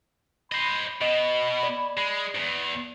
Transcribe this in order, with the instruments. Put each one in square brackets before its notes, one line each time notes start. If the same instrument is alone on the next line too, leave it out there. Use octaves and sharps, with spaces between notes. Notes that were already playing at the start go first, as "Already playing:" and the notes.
[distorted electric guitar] C5 D#5 [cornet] B5
[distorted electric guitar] B2 [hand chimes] D#5
[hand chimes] D5
[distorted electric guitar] G#3
E2 G#2